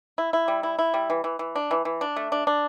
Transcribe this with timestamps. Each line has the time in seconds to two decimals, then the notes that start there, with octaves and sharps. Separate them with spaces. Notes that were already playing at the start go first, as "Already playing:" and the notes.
0.18 E4
0.33 E4
0.48 G3
0.63 E4
0.79 E4
0.94 G3
1.10 E3
1.24 E3
1.39 E3
1.56 D4
1.71 E3
1.85 E3
2.01 D4
2.16 A3
2.32 D4
2.47 D4